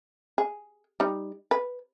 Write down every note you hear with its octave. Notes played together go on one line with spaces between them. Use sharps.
G#4
G3 D#4
B4